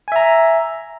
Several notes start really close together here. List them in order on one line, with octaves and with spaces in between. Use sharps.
G#5 E5 A#5